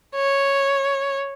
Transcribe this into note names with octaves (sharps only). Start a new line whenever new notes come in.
C#5